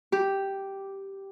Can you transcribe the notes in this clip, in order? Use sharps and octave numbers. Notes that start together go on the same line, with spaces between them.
G4